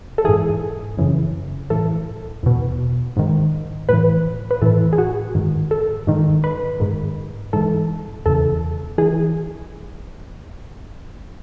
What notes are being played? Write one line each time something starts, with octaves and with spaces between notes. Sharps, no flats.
A4
G#2 E3 G#4
F#2 C#3 E3
A2 E3 A4
E2 B2
G#2 D#3
A2 E3 B4
B4
A2 E3 A4
G#4
F#4
G#2 D#3
A4
G#2 D#3
B4
G#2 D#3
G#2 E3 A4
E2 C#3 E3 A4
E3 G#4